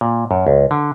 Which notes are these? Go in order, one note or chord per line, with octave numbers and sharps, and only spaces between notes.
A#2
F#2
C#2
D3